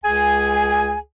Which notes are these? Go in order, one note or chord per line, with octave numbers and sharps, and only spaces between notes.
C#2 G#4 G#5